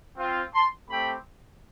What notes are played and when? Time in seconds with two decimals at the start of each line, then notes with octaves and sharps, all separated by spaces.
0.16 C4 F4
0.53 A5 C6
0.89 A3 C4 G4 G5 B5